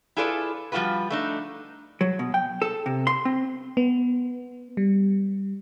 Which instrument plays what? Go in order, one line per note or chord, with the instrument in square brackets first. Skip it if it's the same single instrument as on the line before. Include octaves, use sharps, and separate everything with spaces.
[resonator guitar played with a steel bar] E4 F4 G#4 A4 B4 D5
F3 G3 A3 F4 F#4 B4
A3 D4 D#4
[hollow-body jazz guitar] F#3
B2
G5
A4
C3
C6
C4
[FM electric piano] B3
G3